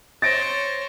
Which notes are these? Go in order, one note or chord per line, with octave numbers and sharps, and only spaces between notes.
C5 C#5 A6 A#6 D7